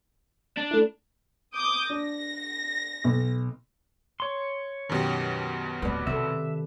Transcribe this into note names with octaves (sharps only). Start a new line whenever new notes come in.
D4
A3 E4
D6 D#6 G6
D4 A#6
B1
C#5 C6
F#2 B2 D#3 G4
D1 B3 B4 D5
C3 D#3 A4 E5